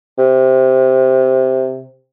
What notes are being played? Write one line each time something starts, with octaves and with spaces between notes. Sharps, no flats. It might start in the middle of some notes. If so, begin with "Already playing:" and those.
C3